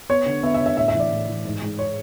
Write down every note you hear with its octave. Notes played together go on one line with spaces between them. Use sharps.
B3 C#5
D3
B3 E5
E5
D3
E5
A2 E5
E5
E3
D5
A2
E3
G#2
G#2
C#5